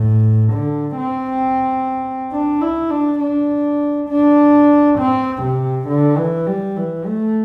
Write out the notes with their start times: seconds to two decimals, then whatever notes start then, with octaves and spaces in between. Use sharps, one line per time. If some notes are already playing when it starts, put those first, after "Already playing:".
Already playing: A2
0.53 D3
0.97 C4
2.32 D4
2.61 E4
2.90 D4
3.19 D4
4.09 D4
4.98 C4
5.43 C3
5.88 D3
6.17 E3
6.47 G3
6.77 E3
7.05 A3